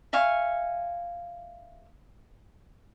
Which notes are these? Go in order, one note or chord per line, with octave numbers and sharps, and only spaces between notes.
E5 F5 G#5 C#6